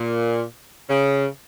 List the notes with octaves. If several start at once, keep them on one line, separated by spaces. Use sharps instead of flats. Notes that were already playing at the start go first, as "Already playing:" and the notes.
Already playing: A#2
C#3